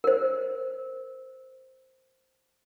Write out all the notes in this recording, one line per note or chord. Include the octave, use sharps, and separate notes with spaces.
A#4 C5